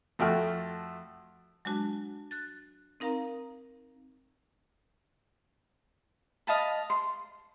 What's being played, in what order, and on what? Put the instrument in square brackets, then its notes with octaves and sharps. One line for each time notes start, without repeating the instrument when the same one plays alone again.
[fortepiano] F2 A3 F#4 G5 F6
[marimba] F#3 G#3 D4 F#4 A5
F#6 A6
C4 D#4 A#4 F5 A#5
[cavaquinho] D#5 F5 A5 B5
C6